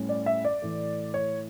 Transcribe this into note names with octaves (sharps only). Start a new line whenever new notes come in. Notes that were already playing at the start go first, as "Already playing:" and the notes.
Already playing: A2 G3 C#4
D5
E5
D5
A2 E3 A3
C#5